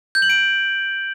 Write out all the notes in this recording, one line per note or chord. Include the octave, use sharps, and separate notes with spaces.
G6
F#7
D7